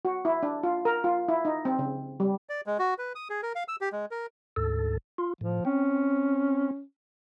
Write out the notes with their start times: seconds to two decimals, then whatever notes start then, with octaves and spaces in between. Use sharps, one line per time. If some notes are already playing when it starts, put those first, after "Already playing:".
0.05 F#4
0.25 E4
0.43 D4
0.63 F4
0.85 A#4
1.04 F4
1.28 E4
1.45 D#4
1.65 C4
1.79 C#3
2.20 G3
2.49 D5
2.66 G#3
2.79 F#4
2.98 B4
3.15 D#6
3.30 G#4
3.43 A#4
3.55 F5
3.68 E6
3.81 G4
3.92 G#3
4.11 A#4
4.56 D2 G#2 A4
5.18 F4
5.41 A2 F3
5.65 C4 C#4